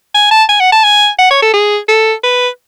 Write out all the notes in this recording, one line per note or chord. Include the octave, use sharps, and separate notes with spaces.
G#5
A5
G#5
F#5
A5
G#5
F#5
C#5
A4
G#4
A4
B4